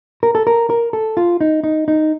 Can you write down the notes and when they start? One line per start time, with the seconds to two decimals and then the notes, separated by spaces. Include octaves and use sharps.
0.23 A#4
0.35 A4
0.47 A#4
0.70 A#4
0.93 A4
1.17 F4
1.41 D#4
1.64 D#4
1.88 D#4